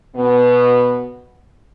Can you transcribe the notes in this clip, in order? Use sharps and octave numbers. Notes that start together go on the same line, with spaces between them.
B2 B3